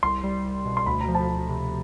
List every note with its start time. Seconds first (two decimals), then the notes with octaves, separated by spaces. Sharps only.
0.03 C2 C6
0.23 G3
0.45 C2
0.65 B2
0.77 C6
0.86 D2 B5
1.01 A#5
1.08 F3
1.15 A5
1.29 D2
1.49 C3